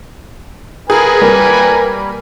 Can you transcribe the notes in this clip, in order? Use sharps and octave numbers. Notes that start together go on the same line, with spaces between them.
G#4 A#4 B4 G#5
G3 A#3